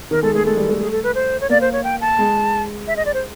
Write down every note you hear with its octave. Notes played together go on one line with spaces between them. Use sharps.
D#3 A#4
G#3 A4
A3 G#4
G#3 A4
G3
A3
G#4
A4
B4
C5
C#5
A#3 D5
C5
C#5
G5
A5
G#3
E5
D#5
D5
C5